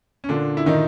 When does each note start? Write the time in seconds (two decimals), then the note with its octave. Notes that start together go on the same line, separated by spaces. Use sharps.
0.24 C#4
0.29 A#2 D3 D4
0.57 E4
0.66 A#2 D#3 D#4